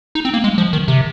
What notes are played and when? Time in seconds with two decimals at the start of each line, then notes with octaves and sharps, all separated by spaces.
0.15 D#4
0.25 C4
0.34 A#3
0.44 G#3
0.58 F3
0.73 D#3
0.88 C3